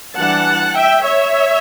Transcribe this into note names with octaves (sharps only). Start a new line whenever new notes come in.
E3 G3 D4 F#5 A5
E5 G5
C#5 E5